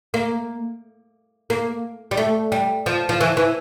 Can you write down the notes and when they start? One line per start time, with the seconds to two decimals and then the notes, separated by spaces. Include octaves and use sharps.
0.14 A#3
1.50 A#3
2.11 G3
2.17 A3
2.52 G3
2.86 F3
3.09 F3
3.21 E3
3.37 E3